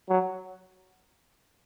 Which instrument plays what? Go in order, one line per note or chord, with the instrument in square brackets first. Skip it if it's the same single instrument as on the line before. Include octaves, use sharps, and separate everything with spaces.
[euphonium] F#3